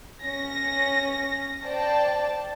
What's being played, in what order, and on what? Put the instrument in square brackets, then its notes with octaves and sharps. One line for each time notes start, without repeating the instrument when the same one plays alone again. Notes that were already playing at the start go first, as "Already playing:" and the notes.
[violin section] C#4 A#6
C5 D5 G5 A5